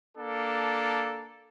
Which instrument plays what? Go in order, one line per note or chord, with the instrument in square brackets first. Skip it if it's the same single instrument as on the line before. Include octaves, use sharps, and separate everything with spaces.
[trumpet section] A#3 D4 A4